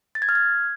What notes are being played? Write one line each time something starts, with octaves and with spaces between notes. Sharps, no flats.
A6
G#6
F6
G#6